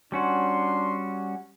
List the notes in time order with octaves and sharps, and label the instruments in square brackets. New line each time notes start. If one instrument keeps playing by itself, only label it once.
[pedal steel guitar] G3 C#4 F#4 [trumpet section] D4 C6